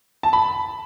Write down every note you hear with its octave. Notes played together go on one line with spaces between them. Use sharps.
A5
B5